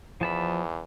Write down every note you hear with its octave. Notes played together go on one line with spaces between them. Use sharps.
E2 F3 A5 B5